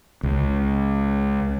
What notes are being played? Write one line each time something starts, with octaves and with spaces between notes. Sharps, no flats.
C#2